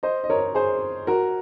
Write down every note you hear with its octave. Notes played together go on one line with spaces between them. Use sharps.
C5 D#5
D#5
A#4 C#5
G#4 C5
F#4 A#4